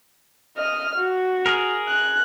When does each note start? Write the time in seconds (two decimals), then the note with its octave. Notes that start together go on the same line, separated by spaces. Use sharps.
0.58 D#5 F6
0.96 F#4
1.46 G#4 A#4
1.88 F#6